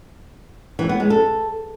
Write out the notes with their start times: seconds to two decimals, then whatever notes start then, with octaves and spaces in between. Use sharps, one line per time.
0.79 E3
0.89 B3
1.00 G#3
1.10 A4